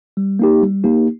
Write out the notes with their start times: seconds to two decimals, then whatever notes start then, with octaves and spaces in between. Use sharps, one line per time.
0.17 G3
0.39 A#3 D#4 G4
0.62 G3
0.84 A#3 D#4 G4